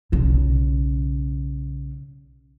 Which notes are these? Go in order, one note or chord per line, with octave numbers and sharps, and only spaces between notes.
B1 C#3